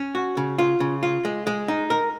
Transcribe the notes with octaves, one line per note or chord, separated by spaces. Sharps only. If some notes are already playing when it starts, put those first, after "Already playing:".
Already playing: C#4
F#4
C#3
F4
C#3
F4
G#3
G#3
D#4
A#4